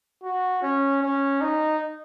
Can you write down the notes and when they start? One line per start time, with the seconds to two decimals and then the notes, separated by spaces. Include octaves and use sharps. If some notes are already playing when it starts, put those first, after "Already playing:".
0.23 F#4
0.62 C#4
1.02 C#4
1.41 D#4